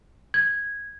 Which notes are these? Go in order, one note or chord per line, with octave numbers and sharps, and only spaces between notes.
G#6